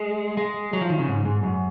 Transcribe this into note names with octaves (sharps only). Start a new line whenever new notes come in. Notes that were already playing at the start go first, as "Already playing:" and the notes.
Already playing: G#3
G#3
F#3
F3
D#3
C#3
G#2
G#2
F#2